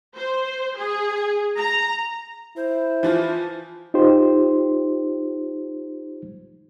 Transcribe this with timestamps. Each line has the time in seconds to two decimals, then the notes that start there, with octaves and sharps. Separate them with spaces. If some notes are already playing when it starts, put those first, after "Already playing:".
0.15 C5
0.77 G#4
1.57 A#5
2.57 E4 C5
3.03 E3 F3 F4
3.94 D#4 F4 G4 C5